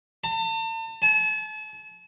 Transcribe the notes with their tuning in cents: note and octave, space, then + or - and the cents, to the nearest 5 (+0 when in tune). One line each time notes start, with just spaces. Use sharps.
A5 +40
A5 -40